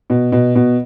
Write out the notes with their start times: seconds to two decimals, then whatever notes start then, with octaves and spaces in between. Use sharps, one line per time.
0.10 B2
0.32 B2
0.55 B2